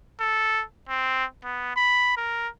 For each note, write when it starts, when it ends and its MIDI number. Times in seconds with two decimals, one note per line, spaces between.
0.20 0.63 69
0.89 1.25 60
1.45 1.74 59
1.76 2.15 83
2.17 2.48 70